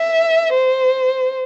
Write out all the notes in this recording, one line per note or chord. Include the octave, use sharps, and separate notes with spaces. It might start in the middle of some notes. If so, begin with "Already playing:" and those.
Already playing: E5
C5